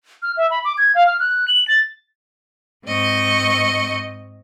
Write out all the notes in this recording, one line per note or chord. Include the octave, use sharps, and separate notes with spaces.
F6
E5
B5
D6
G#6
F5
F6
F#6
F#7
A6
G#2 C4 D#5 C#6